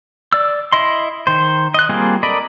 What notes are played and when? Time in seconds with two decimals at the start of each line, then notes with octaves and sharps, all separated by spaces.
0.33 D5 E6
0.72 E4 D#5 C6
1.27 D#3 C5
1.74 D#5 F#6
1.89 G3 A#3 C4 F4 G#4
2.23 A4 A#4 D5 D#5 B5